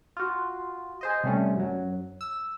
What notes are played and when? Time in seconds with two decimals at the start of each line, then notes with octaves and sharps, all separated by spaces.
0.17 F4 F#4
1.01 G#4 C5 D#5
1.23 C3 G3 A3 C#4
1.55 F#2 F#3
2.21 E6